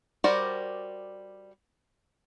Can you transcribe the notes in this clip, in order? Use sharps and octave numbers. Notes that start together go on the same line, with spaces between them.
G3 F#4 A#4 C5 D5